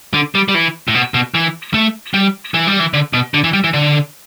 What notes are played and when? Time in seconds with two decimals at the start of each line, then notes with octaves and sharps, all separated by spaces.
0.14 D3
0.35 G3
0.48 G3
0.55 E3
0.88 A2
0.95 B2
1.14 B2
1.34 E3
1.74 A3
2.14 G3
2.54 E3
2.67 G3
2.79 E3
2.94 D3
3.13 B2
3.34 D3
3.44 E3
3.53 G3
3.64 E3
3.74 D3